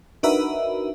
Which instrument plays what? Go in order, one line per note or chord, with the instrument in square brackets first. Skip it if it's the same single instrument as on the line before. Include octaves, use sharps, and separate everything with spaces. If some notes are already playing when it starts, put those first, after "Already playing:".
[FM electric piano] D4 D#4 F#4 A#4 B4 E5